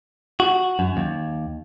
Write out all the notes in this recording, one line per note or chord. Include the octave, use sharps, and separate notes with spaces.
F#4
F#2
D#2